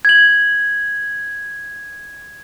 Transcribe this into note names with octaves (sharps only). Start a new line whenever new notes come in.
G#6 F#7